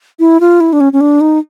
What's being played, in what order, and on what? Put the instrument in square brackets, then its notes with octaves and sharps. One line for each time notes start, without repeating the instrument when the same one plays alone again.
[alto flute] E4
F4
E4
D4
C#4
C#4
D4
D#4